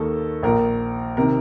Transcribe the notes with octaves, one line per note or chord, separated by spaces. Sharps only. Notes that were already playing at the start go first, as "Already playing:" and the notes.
Already playing: D#2 D#3 A4
A#1 A#2 A#4
C3 D#3 A#4